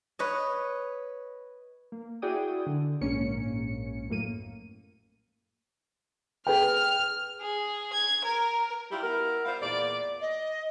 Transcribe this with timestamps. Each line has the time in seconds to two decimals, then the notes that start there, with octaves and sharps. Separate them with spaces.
0.19 B4 C#5 D#5
1.92 A#3
2.22 E4 F#4 G#4 D5 G5 D#6
2.66 D3
3.01 A#1 G#2 A#3 C#4 C#7
4.09 F#2 A2 A#3 D#7
6.47 G#4 B4 G5 F6
7.42 G#4
7.94 G#6
8.25 A#4
8.91 G3 E4 F4 G4
9.03 B3 E4 A#4
9.45 G3 F4 C5 F5
9.62 E2 A#2 D5
10.21 D#5